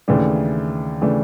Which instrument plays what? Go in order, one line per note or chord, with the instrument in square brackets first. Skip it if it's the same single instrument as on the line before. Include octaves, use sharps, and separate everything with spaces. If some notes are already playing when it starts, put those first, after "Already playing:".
[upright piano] D#2 C#3 E3 A3 D4
C#3 E3 A3 D4